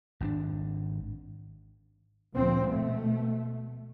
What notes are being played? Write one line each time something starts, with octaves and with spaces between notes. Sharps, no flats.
G#1 D#3 D4
D2 A#2 F3 C4
B2 A3